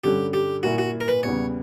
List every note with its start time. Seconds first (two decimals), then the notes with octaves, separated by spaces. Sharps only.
0.04 G2 D3 G3 C#4 G4
0.33 G4
0.63 A#2 A#3 E4 F#4
0.78 F#4
1.01 A#4
1.08 B4
1.23 E2 C#3 G3 B3 C#5